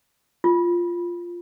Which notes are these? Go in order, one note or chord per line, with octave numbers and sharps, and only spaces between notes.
F4